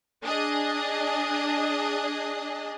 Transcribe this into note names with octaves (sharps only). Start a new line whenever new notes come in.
D4 G#4 D#5